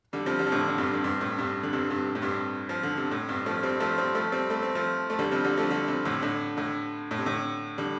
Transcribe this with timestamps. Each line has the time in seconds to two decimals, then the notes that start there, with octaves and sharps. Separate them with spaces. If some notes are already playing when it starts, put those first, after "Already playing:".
0.13 D3 G3
0.26 C3 F3
0.39 D3 G3
0.47 F3
0.52 A2 D3
0.68 D3
0.78 G2 C3
0.94 D3
1.04 G2 C3
1.21 A2
1.38 G2 C3
1.63 D3
1.73 G2 C3
1.90 G2 C3
2.08 C3
2.15 A2
2.22 G2 C3
2.69 F3
2.83 D3
2.97 C3
3.11 A2
3.28 G2 C3
3.46 F3 A3
3.63 G3 C4
3.80 F3 A3
3.98 G3 C4
4.15 F3 A3
4.32 G3 C4
4.50 A3
4.62 C4
4.75 F3 A3
5.10 A3
5.19 D3 G3
5.31 C3 F3
5.44 D3 G3
5.57 F3 A3
5.70 D3 G3
5.88 C3 F3
6.05 A2 D3
6.22 A2 D3
6.57 A2 D3
7.11 A2
7.18 C3
7.26 A2 D3
7.78 D3 G3